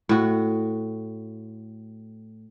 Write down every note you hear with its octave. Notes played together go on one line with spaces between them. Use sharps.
A2 F#4